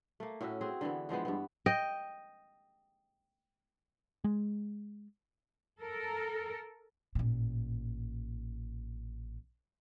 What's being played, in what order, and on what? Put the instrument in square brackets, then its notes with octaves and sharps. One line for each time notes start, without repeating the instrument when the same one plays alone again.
[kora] A3 A#3
A2 C#4 F#4 E5
C4 F#4 G#4
D3 E3 B3
E3 F3 G#3 B3
G2 B3
D#5 G5
[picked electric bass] G#3
[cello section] A4 A#4
[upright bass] A1 A#2